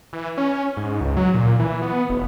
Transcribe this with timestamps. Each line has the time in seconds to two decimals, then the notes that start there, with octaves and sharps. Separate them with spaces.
0.13 E3
0.38 C#4
0.77 G#2
1.01 C#2
1.17 F#3
1.34 A#2
1.59 E3
1.82 B3
2.10 F1